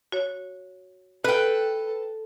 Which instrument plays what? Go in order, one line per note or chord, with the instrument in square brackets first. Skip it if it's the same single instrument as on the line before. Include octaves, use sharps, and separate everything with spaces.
[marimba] F#4 C#5
[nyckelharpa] A4 [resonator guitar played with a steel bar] B4 G5 [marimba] B5